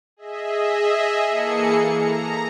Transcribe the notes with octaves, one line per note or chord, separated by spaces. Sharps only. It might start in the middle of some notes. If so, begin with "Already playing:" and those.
G#4 D#5 E5
E3 A#3 G#4 A4 C#7
A#5